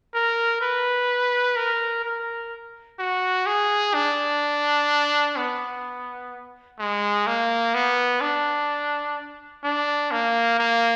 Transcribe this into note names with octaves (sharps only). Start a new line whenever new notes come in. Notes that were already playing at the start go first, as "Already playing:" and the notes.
A#4
B4
A#4
A#4
F#4
G#4
D4
B3
G#3
A#3
B3
D4
D4
A#3
A#3